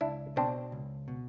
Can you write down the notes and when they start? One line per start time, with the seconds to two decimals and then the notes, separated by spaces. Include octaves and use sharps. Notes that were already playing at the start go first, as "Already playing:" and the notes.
0.01 C#2 D4 E4
0.36 B2 C4 D4
0.72 C#2
1.08 B2